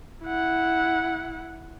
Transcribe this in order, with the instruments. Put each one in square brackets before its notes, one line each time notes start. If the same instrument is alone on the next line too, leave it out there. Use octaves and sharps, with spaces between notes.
[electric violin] E4 F#5